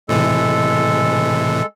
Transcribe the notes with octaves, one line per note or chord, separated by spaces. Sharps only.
A2 C3 E3 G#3 A4